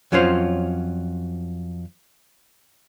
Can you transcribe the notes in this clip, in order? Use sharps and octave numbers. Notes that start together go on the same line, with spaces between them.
F2 F#3 C#4 F4 C5